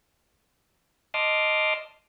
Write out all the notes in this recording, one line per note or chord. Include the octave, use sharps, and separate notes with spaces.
D#5 A5 C6 D6 D#6 F6